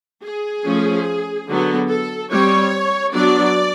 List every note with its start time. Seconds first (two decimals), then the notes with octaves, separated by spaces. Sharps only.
0.24 G#4
0.66 F3 A3 C#4
1.47 D3 F#3 B3
1.89 A4
2.30 G3 C4 C#5
3.14 F#3 B3 D4 D5